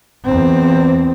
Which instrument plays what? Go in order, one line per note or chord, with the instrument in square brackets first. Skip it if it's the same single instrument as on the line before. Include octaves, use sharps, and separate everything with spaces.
[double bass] E2 C4